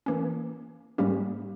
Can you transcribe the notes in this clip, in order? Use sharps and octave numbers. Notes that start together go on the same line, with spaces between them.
E3 A#3 C#4
G#2 G3 A#3 C#4 G4